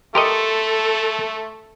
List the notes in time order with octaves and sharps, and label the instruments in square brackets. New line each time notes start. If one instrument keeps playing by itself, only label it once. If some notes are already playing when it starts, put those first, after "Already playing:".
[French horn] A3 [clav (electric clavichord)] G4 A#4 D#5 [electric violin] A4 [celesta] C6 C#7